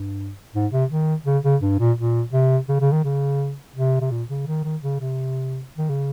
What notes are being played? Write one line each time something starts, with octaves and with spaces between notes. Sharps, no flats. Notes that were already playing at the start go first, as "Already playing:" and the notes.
Already playing: G2
G#2
C3
D#3
C#3
C#3
G2
A#2
A#2
C3
C#3
C#3
D#3
C#3
C3
C3
A#2
C#3
D#3
D#3
C#3
C3
D#3
C#3